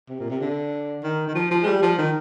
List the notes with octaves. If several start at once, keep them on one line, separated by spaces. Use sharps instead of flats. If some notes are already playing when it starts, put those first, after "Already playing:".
C3
A#2
C3
D3
D#3
D#3
F3
F3
G#3
G3
F3
D#3